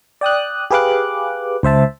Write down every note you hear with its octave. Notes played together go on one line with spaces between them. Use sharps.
D5 G5 D#6 F#6
G4 G#4 B4 F5 D6 F#6
C#2 C5 E5 A5